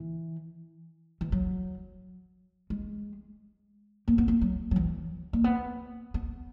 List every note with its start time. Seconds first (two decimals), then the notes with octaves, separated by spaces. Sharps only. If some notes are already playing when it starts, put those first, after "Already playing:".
Already playing: E3
1.21 E3
1.32 F#3
2.70 G#3
4.08 A#3
4.18 B3
4.28 A#3
4.41 F#3
4.71 F#3
4.76 E3
5.33 A#3
5.44 B3
6.14 B3